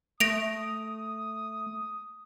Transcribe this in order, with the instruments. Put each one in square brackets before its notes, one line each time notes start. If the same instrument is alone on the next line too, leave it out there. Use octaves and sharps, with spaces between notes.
[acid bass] A3 [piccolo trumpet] D#6 [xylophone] A#6 D7 F7